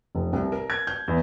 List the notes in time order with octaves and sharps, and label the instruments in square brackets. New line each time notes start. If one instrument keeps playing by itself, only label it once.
[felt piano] F1
C2
A#4
G#6
G6
E2